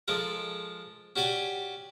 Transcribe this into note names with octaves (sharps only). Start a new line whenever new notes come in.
F3 G#3 A4 A#4
C#4 F#4 G4 D5 G#5